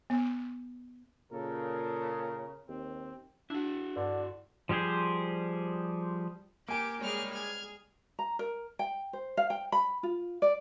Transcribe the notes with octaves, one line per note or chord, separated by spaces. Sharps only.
B3
A#2 C#3 A4 A#4
D#2 C4
D4 E4 F#4
G2 D3
F3 G3 G4 G#4 C5
A#3 G4 G#5 D7
G3 G#3 G#4 C#5 F6
G#4 F6 G#6
A#5
A#4
G5
C5
F5
G5
B5
F4
D5